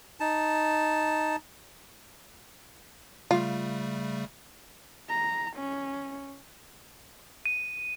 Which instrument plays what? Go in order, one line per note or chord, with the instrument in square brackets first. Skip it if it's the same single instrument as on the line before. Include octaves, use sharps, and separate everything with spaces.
[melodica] D#4 A5
[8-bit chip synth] C#3 G3 A3 [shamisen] F4
[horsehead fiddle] A#5
C#4
[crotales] D#7